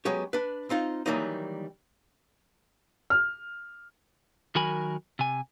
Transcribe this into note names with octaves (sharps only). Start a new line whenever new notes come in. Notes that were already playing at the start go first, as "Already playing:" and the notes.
F#3 G#3 B3 C#4 G4
D4 B4
C4 D#4 F4
D#3 E3 F#3 G3 A#3 D#4
F6
D#3 F#3 F#4 A#4 G#5 B5
C3 G#5